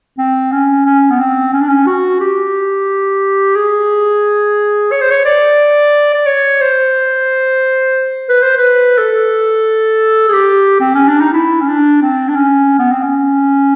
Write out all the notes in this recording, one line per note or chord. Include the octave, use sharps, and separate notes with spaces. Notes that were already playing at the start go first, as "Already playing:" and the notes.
C4
C#4
C#4
B3
C4
C#4
D4
C#4
F#4
G4
G#4
C#5
C5
C#5
D5
D5
C#5
C5
B4
C5
B4
A4
G#4
G4
C4
C#4
D4
D#4
E4
C#4
D4
C4
D4
C#4
B3
C4
C#4